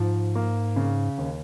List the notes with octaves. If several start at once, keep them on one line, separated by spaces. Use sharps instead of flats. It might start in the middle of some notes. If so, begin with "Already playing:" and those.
Already playing: G#2 F3
A#3
C#3
D#2